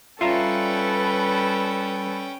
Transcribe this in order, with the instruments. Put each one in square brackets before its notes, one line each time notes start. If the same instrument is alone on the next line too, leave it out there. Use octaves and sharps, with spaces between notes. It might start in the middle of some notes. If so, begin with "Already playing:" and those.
[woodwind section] G3 [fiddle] C#4 G5 [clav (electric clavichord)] F4 E5 A#5 [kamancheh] A4 B4